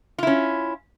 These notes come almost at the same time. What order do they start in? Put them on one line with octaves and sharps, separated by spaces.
F4 E4 C#4